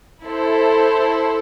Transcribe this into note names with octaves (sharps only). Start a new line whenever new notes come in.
E4 A4 C5